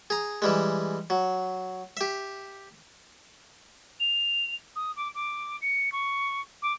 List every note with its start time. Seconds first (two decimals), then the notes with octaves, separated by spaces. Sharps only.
0.10 G#4 A#5
0.42 E3 G3 G#3
1.10 F#3
1.97 G4 E5
4.00 F7
4.76 D#6
4.96 D6
5.15 D6
5.62 C#7
5.92 C#6
6.62 D6